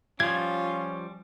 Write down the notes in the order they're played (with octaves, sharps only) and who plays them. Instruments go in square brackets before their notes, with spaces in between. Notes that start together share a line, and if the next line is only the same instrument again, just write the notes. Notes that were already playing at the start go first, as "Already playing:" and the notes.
[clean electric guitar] F3 G3 [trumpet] C#4 [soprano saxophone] F4 [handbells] G#6